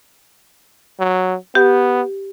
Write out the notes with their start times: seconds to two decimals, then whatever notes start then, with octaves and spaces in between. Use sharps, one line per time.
1.00 F#3
1.55 B3 G4